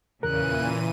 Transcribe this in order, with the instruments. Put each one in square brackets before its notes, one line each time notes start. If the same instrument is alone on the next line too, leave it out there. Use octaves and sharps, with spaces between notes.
[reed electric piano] E2 A#4 [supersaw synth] A#2 E3 D#7 [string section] C#3 [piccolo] F#6